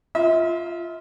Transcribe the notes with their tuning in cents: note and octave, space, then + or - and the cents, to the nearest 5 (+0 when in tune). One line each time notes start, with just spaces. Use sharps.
F4 -10 E5 -40